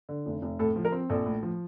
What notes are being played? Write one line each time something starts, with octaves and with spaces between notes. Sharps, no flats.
D3
F1
F1
A2 A4
F3
A#4
C4
A#1 A4
A2
F3